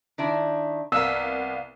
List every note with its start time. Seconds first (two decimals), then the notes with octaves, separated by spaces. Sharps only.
0.18 D#3 D4 E4
0.92 C2 B3 A#4 F5 F#5 E6